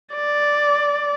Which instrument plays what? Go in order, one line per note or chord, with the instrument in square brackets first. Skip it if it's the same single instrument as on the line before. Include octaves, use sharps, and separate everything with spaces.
[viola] D5